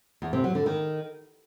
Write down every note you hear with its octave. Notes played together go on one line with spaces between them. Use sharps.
E2
C3
F#3
D3
D#3